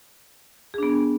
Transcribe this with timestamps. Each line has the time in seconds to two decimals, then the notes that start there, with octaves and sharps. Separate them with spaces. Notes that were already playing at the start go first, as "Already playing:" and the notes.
0.74 G#4
0.78 D4
0.83 B3